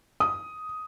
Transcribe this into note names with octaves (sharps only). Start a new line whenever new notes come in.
D#6